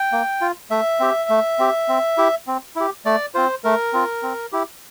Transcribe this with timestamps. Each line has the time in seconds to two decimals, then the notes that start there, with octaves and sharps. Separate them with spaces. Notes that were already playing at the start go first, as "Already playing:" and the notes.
Already playing: G5
0.12 A#3
0.41 F4
0.70 A3 E5
1.00 C4 G4
1.29 A3
1.59 C4 G4
1.88 C4
2.18 E4 G4
2.47 C4
2.76 E4 G4
3.05 A3 D5
3.35 C4 F4 C5
3.64 A3 A#4
3.93 C4 F4
4.23 C4
4.52 E4 G4